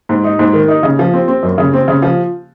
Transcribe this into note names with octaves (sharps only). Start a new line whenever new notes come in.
G#2
D#4
G#2
D#3
D#4
C#3
F3
C4
C4
F#2
C#3
C4
C#3
F3